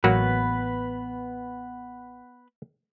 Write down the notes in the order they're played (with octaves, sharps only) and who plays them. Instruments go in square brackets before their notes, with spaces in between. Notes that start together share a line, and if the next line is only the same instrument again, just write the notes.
[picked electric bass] A1 [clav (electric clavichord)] F#3 A#3 F#4 [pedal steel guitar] B3 B4